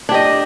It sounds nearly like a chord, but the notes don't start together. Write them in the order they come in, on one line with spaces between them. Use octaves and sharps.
D4 G4 D#5